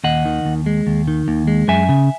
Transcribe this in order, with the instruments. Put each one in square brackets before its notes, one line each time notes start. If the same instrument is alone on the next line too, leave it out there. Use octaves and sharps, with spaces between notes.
[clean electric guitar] D#2 D#5 F#5
D#3
D#2
G#3
D#2
D#3
D#2
G#3
F#2 E5 G#5
C#3